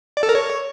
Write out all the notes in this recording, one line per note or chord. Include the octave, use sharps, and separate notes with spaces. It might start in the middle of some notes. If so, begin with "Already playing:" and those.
D5
A4
A#4
C#5